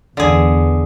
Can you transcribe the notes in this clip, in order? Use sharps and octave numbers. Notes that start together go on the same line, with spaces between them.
E2 D3 G#4